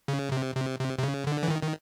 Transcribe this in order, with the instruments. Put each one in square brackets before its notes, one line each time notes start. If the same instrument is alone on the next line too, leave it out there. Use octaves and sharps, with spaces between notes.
[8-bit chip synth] C#3
C3
C3
C3
C3
C#3
D3
E3
D#3
D#3